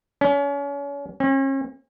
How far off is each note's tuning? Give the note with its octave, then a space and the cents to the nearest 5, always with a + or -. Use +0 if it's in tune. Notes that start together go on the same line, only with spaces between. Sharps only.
C#4 +35
C#4 -40